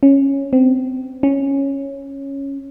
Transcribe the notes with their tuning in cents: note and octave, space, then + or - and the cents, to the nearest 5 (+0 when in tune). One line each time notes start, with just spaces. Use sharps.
C#4 -5
C4 -25
C#4 -5